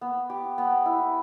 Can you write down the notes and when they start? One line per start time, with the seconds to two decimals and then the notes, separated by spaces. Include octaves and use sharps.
0.01 B3
0.30 G4
0.58 B3
0.86 E4